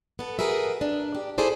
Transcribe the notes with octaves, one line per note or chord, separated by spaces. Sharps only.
B3 A4
F#4 G#4 A#4 B4 E5
D4
G4
E4 G#4 A4 C5 D5